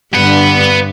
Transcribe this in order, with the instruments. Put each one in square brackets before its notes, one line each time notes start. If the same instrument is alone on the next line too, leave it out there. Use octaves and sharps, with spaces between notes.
[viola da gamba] G2 D3 [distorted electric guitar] B4 F#5